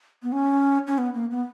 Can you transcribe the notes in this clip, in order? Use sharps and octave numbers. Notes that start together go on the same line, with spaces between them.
B3
C#4
C#4
B3
A#3
B3